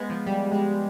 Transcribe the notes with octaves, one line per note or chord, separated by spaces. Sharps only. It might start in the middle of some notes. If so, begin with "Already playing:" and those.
Already playing: G#3 B3
F3
G3
G#3